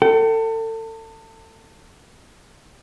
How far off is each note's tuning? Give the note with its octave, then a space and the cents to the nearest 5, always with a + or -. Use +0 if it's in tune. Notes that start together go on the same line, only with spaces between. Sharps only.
A4 +30 G5 -35